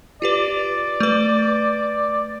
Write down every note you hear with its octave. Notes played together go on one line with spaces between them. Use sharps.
F4 G4 B4 D5
A3 B4